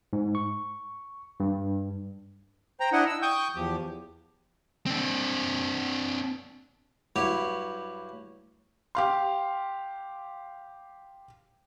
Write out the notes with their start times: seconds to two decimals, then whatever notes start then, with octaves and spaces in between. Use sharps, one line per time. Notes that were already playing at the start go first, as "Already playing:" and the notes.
0.13 G#2
0.35 C#6
1.40 G2
2.80 C5 G5 A#5
2.92 D4 E4 D#5 F#5
3.07 E6
3.22 G5 C#6 D#6 G6
3.56 E2 F3 G4
4.86 C4 D4
7.16 G2 F#3 E4 G4 C#5
8.95 G4 F5 C6